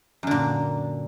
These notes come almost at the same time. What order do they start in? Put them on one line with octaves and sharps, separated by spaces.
F#2 D3 A#2